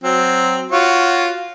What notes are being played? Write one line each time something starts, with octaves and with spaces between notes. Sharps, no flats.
F#3 C4
F4 F#4 C#5